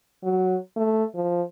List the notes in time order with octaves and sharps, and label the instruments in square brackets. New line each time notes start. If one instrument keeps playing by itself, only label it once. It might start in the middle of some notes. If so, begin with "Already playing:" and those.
[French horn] F#3
A3
F3